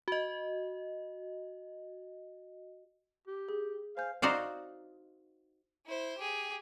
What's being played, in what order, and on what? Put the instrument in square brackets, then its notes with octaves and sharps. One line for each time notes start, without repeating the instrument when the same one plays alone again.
[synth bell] F#4 D#5
[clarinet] G4
[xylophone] G#4
[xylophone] C5 G#5 G6 [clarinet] F5
[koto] D#4 F#4 C5 D5 F5
[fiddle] E4 C5
G4 G#4